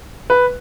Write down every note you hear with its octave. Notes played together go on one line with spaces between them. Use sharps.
B4